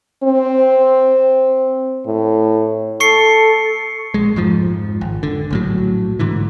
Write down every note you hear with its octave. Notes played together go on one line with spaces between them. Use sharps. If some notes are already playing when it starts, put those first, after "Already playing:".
C4
A2
A4 C#6 C7 C#7
A#1 G#3
F2 G#2 F3
G#1
D3
A#1 A2 F#3
G#2 D3 E3